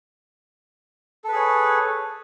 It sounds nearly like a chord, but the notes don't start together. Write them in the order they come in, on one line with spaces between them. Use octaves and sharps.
A4 B4 G#4 C#5